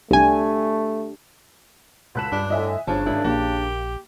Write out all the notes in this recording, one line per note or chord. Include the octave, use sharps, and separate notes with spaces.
C2 A3 D4 G4 G#5
C#2 A4 F#5 B5 F#6 E7
G2 D4
A2 D3 D#5 E5 G#5
G1 C#3 F3 D4 C#5 A5
G#1 E4
A#1 A#3 G4